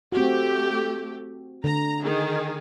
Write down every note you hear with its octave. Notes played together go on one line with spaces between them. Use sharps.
A3 C4 F#4 G4
D3 A#5
D#3 G#4